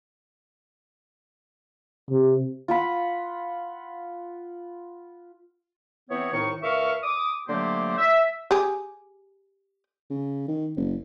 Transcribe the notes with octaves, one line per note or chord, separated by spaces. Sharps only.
C3
F4 F#5 B5
E3 B3 C4 C#5
C2 A2 D#3 D#4 C#6
C#2 A#4 E5 F5 C#6
D6 D#6
D3 F#3 A3 A#3 G4 C5
E5
G4 G#4
C#3
D#3
F#1